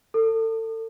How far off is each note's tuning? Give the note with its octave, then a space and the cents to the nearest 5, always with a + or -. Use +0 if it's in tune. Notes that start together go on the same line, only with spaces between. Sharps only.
A4 +30